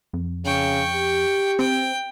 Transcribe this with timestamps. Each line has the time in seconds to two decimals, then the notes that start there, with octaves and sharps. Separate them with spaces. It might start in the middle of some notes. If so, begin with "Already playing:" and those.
0.13 F2
0.45 C#3 G5 C#6
0.94 G4
1.59 C4 G5